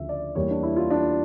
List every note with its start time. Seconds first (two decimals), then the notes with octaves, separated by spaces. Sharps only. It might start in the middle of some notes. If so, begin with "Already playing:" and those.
Already playing: D2 C#3 F3 E5
0.09 D5
0.35 E2 E3 G3 A#3 C#5
0.50 D4
0.63 E4
0.76 F4
0.90 D4